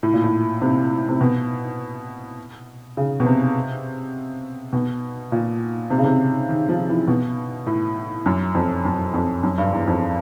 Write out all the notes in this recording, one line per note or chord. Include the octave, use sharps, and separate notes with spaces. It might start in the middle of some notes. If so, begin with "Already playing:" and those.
A2
A#2
A2
C3
C3
B2
C#3
B2
C3
B2
A#2
C3
C#3
C3
D#3
F3
E3
B2
A2
F#2
F2
F#2
F2
F#2
G2
E2
F2